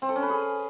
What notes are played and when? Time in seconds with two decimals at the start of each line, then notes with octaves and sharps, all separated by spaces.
0.02 C4
0.09 A4
0.16 C#4
0.23 B4
0.30 G#4